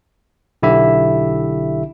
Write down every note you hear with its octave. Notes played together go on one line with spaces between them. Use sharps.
B1 D3 E4 G4 E5